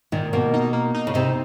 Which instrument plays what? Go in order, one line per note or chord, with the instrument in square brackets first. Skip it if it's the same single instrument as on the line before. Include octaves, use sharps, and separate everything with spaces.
[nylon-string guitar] A#2 [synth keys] D#3
[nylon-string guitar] B2 [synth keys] A#3
[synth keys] D#4
A#3
D#4
[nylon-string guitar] C#3
[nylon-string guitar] C3 [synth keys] D#4